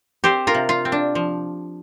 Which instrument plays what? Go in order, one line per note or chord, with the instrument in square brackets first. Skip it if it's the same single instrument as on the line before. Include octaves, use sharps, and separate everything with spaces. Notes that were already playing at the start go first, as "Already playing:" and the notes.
[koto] C4 G4 C5
F4 A#4
C3
F4
C4
D4
F3